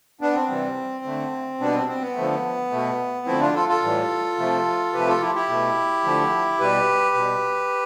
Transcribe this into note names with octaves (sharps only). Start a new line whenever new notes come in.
B3 D4
C4
C3 E3 G3
D3 A3
B2 G3 B3 D4
C4
C4
B3
D3 F3 A3
B2 A3
D3 F3 A3 C4 E4
D4 F4
F4 A4
F4 A4
A2 E3 G3
C3 F3 A3
C3 F3 A3 G4 B4
F4 A4
E4 G4
E4 G4
B2 A3
D3 F3 A3
B2 G3 G4 B4
B2 G3